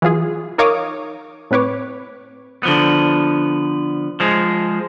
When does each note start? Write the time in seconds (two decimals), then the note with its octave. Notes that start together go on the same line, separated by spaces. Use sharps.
0.02 E3 F#3 F4 G#4
0.58 D#4 A#4 C#5 F5 D6 D#6
1.51 A2 C4 B4 C#5 D6
2.63 D3 F3 B3
4.20 F3 G#3